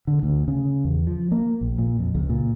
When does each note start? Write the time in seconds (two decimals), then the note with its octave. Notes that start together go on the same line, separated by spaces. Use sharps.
0.07 D3
0.23 D2
0.48 C#3
0.84 E2
1.07 F3
1.32 A#3
1.61 A#1
1.78 A#2
1.99 F2
2.15 C#2
2.29 A#2